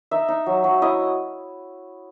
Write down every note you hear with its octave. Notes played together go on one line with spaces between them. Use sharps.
D#4 E5
D#4
F#3
F#3
E4 D#5